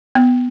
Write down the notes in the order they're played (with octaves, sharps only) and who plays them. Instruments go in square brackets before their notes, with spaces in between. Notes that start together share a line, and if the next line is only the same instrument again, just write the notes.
[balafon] B3